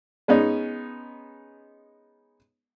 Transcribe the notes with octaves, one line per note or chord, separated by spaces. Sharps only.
G#3 B3 C#4 D#4